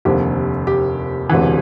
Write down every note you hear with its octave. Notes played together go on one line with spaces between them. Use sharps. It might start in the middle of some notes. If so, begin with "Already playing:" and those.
F1 D#2 D3 F3 G4
G4
E1 D2 C3 E3